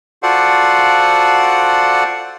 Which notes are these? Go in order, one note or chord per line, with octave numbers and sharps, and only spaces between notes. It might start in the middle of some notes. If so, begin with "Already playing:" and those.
F4 F#4 A4 C5 D5 F#5